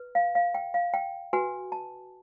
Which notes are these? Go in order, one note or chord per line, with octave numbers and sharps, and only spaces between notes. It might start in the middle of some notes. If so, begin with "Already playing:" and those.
Already playing: B4
F5
F5
G5
F5
G5
F#4 B4 G#5
A5